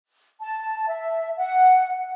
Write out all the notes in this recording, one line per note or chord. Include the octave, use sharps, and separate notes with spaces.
A5
E5
F#5